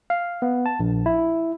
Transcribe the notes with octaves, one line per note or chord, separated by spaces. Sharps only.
F5
B3
A5
A#1
E4